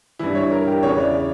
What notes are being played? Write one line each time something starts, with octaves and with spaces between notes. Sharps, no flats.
G2 E3 E4
C#5
A#4
G4
E2 C#3 E3 C#5
D5